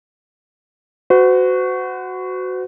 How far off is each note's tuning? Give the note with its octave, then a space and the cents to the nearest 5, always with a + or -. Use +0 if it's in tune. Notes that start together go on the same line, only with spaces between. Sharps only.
F#4 +0 C5 -45